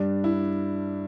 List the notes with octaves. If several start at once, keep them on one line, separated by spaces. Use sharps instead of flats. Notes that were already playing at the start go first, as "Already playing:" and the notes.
Already playing: G2 G3 D4
E4